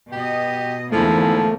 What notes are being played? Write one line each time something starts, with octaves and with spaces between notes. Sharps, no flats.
B2 G4 D#5
E2 G#2 D3 F3 A3 A#3 E4